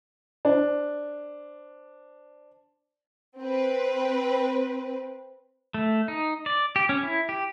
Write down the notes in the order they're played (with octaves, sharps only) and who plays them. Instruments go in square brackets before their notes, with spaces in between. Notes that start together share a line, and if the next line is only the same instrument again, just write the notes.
[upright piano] D4 C5
[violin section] C4 B4
[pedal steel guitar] A3
D#4
D5
G4
C#4
E4
G4